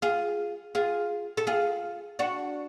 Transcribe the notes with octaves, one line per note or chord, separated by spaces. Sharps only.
F4 G#4
F4 G#4
A4
F4 G#4
D4 F#4